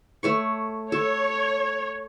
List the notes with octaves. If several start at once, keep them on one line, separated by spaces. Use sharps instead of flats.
A3 C#5 C#6
A4 C#5